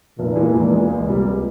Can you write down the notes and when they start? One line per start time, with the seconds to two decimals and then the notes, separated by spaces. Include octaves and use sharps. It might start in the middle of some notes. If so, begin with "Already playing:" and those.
0.18 F1 A#2
0.36 E2 E3 G#3
0.53 F1
0.72 E2 E3 G#3
0.89 C#2
1.06 C3 G3 A#3
1.24 C#2